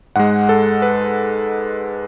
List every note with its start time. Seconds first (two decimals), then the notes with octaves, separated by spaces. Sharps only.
0.16 G#2 G#3 F#5
0.49 A4
0.82 B4